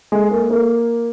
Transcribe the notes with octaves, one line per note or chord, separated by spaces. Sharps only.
G#3
A#3
A#3